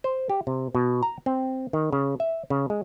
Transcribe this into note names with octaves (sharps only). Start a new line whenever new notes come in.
C5
G4
C3
B2
A#5
C4
D#3
C#3
E5
C#3
G#3